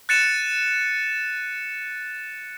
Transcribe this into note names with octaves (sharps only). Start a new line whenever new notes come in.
F#6 A6 C#7 D#7 E7